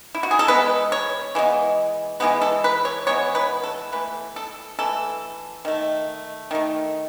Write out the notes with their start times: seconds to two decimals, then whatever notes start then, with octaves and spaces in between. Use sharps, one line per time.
0.15 E4
0.23 F#4
0.31 G#4
0.39 A4
0.48 E3 G#3 B3 B4
0.92 C#5
1.35 E3 G#3 B3
2.20 E3 G#3 B3 B4
2.42 A4
2.64 B4
2.85 C#5
3.07 E3 G#3 B3 C#5
3.35 B4
3.64 A4
3.92 E3 A3 B4
4.36 A4
4.79 E3 A3 A4
5.65 D#3 A3
6.51 D#3 A3